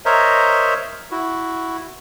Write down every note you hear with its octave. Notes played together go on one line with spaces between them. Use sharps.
A#4 C5 C#5 D#5 E5 A#5
E4 F#4